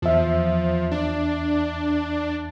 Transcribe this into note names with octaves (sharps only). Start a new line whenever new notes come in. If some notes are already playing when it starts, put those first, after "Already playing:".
E2 F3 E5
D4